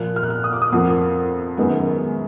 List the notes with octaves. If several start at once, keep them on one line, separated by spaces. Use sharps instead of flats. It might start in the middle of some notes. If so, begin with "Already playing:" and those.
Already playing: A#2 F3 A#3 F#6
F6
F#6
F6
D#6
D6
D#6
F2 F3 A#3 F#5
F#2 D#3 G#3 B3